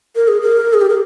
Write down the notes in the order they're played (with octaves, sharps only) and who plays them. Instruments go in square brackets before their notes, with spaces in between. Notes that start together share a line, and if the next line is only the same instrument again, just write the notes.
[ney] A#4
G#4
A#4
G#4
G4
A#4